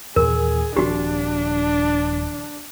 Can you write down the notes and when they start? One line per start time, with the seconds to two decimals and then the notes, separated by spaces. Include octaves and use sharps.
0.16 D#2 A#2 E3 G#4 A#4
0.77 D#1 F3 C4 D4 F#4 G4